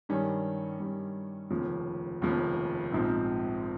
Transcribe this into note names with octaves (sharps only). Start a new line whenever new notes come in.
G2 D#3 G3 C#4
G2 D#3 G3 C#4
F1 D#2 C#3 F3
F1 D#2 C#3 F3
A#1 G#2 F3 C4 D#4